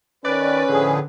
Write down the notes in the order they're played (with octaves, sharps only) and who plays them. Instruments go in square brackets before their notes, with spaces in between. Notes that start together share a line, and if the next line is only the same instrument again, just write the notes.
[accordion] D#3 [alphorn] C#4 [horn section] B4 [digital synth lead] D5
[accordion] A2 F3 G#4 [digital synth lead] D3